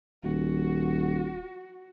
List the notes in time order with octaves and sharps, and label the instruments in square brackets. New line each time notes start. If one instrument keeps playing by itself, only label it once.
[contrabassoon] D#1 [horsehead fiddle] F#4